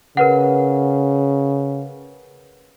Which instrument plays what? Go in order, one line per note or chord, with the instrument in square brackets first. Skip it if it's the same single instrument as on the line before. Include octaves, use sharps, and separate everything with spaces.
[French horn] C#3 [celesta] A#4 B4 F#5